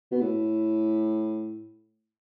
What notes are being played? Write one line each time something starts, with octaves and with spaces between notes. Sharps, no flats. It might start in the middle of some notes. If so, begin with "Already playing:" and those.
B2
A2